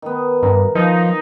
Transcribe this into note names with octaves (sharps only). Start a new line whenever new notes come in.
D#3 B3
G2 A#4
F3 D#4